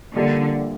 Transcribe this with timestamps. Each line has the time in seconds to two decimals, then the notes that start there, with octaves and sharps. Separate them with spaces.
0.15 A#1 A#2 D3 G3 A#3 D4